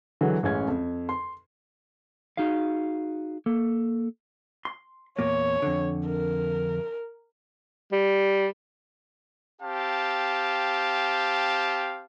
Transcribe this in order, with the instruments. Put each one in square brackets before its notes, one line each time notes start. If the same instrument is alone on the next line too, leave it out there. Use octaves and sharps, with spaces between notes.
[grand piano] D3 E3 F#3 G#3
A1 G#3 C#4 G#6
F2
C6
[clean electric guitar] D#4 F#4 G#4 F5
A#3 A4
[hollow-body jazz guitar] C6
[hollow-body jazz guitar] E2 A#2 A#3 [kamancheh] C#5
[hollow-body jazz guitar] F2 D3
[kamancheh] A#4
[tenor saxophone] G3
[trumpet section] C4 G4 F5 A5